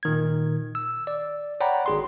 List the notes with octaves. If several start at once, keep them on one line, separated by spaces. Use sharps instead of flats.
A#2 D#3 G#6
E6
D5
C#5 D5 F#5 G5 A#5 B5
G#1 G#4 C6